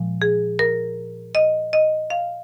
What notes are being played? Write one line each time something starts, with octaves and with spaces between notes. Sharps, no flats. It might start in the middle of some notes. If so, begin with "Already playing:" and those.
Already playing: A#2 F3 G#3
G#4
A#4
D#5
D#5
F5